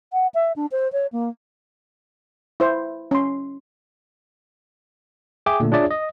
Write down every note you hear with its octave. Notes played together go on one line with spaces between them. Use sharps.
F#5
E5
D4
C5
C#5
A#3
E4 C5
C#4 C6
G#4 E5 G5 G#5 D6
A#2 D3 A3
D4 F4 G#4 C#5 D5 E5
D#5